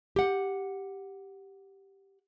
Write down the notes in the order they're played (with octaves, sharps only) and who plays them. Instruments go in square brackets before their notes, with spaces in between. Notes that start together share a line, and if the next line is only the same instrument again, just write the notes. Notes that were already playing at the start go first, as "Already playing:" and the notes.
[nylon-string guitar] G4 F#5